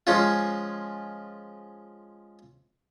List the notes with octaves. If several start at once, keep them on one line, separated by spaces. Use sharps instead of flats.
F3 G#3 C#4 F4